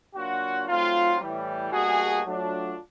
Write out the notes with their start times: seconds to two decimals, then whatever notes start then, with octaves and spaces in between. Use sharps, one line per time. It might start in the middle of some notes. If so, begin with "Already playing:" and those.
0.15 F#3 A#3 D4 F4 F#4
0.68 F#3 A3 C4 D#4 F4
1.20 A2 E3 G3
1.72 B2 G3 A#3 D4 F#4 G#4
2.24 F#3 A3 D4 F4